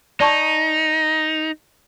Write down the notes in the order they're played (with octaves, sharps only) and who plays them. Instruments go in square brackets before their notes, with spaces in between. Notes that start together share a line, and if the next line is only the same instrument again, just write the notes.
[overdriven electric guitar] D#4 [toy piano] D5 A5 C#6